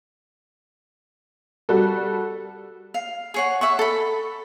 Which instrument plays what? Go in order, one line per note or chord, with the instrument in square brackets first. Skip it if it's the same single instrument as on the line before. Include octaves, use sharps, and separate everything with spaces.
[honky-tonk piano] G3 F#4 A4
[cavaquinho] F5
G#4 C#5 F#5
E5 F#5 C#6
A4 B5